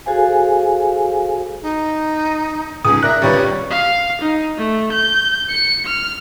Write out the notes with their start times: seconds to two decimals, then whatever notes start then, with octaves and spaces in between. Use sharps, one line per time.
0.06 F#4 G#4 A4 C5 F5 G#5
1.62 D#4
2.85 C#2 G#2 G#4 D#6
3.03 A#4 D5 E5 F#6 A#6
3.22 G#1 C#2 G3 B4 C#5
3.70 F5
4.21 D#4
4.58 A3
4.92 G6
5.49 C#7
5.86 F6